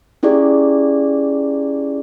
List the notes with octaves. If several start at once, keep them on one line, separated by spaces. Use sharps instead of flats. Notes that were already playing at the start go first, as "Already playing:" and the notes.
C#4 E4 G4 G#4 D5